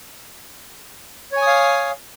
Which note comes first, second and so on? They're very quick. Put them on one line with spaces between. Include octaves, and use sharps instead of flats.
C#5 G#5 D#6 F5